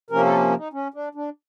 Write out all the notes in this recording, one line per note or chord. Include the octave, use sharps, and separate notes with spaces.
C3 F3 A#3 C#4 A#4
A4
D#4
C#4
D4
D4